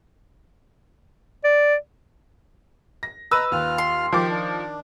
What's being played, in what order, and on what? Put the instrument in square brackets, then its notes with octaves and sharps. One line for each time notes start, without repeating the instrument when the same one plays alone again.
[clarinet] D5
[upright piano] A#6
[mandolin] B4 [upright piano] D#5 D#7 [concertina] A#5 [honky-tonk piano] E6
[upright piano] D#2 [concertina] F4 F6
[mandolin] C6
[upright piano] D#3 D6 [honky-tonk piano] F3 [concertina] G4
[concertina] D4